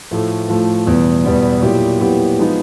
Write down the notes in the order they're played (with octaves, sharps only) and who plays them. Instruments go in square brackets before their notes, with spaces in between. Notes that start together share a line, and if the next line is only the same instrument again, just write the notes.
[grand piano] A2 F3 A3
A2 F3 A3
E2 B2 G3 B3
E2 B2 G3 B3
A#2 F#3 B3 E4 G4
A#2 F#3 B3 E4 G4
F3 G#3 B3 D#4